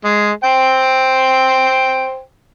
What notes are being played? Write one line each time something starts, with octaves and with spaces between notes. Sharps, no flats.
G#3
C5 G5